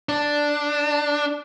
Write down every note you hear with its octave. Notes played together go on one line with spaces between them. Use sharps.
D4